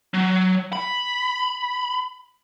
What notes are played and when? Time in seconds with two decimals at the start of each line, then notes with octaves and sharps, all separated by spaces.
0.14 F#3
0.73 B5